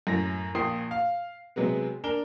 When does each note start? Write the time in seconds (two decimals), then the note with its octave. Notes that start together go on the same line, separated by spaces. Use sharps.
0.07 F#2 A2 A#6
0.55 A#1 A#2 G5 D#6 C7
0.91 F5
1.56 C3 F#3 G#3 B3
2.04 D4 A#4 G7